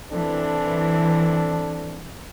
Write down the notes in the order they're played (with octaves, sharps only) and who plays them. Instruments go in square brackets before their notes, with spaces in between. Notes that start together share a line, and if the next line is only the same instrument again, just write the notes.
[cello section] E3 [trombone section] C4 D4 A4